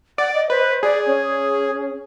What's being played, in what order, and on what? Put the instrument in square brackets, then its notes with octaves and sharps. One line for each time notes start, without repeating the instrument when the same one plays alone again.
[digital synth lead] D5 [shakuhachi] F#5
[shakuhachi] D#5
[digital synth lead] B4 [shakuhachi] C5
[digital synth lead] G#4 [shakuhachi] D5
[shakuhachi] C#4